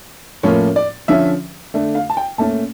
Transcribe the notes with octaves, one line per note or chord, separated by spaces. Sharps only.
A2 F3 A#3 C#4 C#5
D5
D3 F3 C#4 E5
D3 A3 D4
F5
A5
G5
A#2 A3 C#4 A5